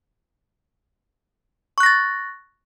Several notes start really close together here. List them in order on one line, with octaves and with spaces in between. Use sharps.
C#6 F#6 A#6 A6